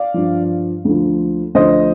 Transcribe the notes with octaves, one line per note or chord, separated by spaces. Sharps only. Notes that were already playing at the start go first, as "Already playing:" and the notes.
Already playing: D5 F5
G2 F3
D2 D3 F3
D2 D3 F3 C5 D#5